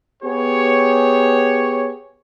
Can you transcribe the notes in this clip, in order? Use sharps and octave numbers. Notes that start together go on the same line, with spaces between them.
B3 G4 G#4 C#5